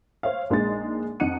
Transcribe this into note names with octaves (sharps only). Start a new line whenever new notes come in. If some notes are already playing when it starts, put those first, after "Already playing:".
C5 C#5 E5 F5
A#1 G#3 D#4 A6
F2 D#4 F#5 F#6 C#7 D#7